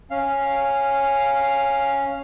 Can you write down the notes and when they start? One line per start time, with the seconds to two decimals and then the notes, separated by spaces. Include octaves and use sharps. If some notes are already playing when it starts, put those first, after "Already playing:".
0.11 C#4 F5